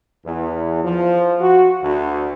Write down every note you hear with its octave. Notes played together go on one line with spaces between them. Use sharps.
E2
F3
F#4
D2